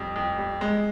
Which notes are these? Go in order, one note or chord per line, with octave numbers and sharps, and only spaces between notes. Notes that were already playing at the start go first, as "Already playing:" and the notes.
Already playing: F2 G3
F2
G3
G#3